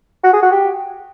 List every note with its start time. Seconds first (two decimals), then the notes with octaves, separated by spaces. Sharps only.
0.24 F#4
0.33 G#4
0.43 F#4
0.52 G4